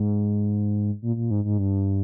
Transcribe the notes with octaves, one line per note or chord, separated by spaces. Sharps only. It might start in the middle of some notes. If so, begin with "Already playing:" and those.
Already playing: G#2
A#2
A#2
G#2
G#2
G2